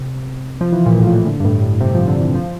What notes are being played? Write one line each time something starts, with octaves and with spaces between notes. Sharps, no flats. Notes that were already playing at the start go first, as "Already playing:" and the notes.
Already playing: C3
F3
E3
A#2
A2
F3
E3
D3
G2
A2
A2
C3
F3
D3
E3
F3